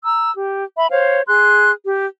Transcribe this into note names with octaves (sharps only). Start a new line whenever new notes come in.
A#5 E6
G4
E5 B5
C5 C#5 F5
G#4 C6 F#6
G4